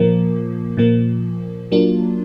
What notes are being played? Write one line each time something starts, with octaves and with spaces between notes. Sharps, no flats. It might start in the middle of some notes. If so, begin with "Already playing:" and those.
Already playing: A#2 F3 A#3
A#2 F3 A#3
F#3 A#3 D4 F4